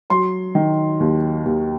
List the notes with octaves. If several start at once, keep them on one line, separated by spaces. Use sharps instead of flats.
F#3 C6
D#3
D#2
D#2